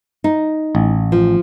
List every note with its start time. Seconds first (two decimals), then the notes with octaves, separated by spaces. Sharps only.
0.24 D#4
0.75 A1
1.12 F3